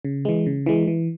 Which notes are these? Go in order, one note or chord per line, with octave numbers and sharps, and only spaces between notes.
C#3
E3 G#3
C#3
E3 G#3
E3